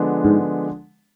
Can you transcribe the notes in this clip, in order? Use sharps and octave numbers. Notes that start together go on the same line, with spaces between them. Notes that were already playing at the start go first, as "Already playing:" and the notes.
Already playing: D3 F3 G#3 B3 D4
G#2